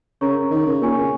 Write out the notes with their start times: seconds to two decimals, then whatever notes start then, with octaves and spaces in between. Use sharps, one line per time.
0.21 C#3 A#4 C#5 A#5 C#6
0.51 D#3
0.66 C#3
0.81 A#2 A#4 C#5 G#5 C#6
0.96 C#3